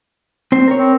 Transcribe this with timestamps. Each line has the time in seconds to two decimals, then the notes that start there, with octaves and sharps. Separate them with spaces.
0.52 C4 C5
0.68 A#4 C#5
0.79 C4